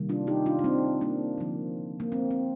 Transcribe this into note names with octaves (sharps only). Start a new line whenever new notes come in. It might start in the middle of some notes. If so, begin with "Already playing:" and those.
Already playing: C3 D#3 G3 A#3
D4 F4
D#4 G4
D4 F4
D4
C4 D#4
A#3 D4
D3 F3 A#3
A#3
C4
C4